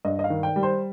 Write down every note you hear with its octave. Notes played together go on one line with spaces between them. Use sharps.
G2 D#5
D#5
F5
D#3
G5
G3
C5